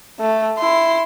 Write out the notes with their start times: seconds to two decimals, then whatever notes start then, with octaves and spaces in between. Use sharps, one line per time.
0.20 A3
0.58 E4 C6